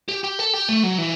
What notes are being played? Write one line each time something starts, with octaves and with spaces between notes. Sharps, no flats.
G4
G4
A4
G4
A3
F#3
E3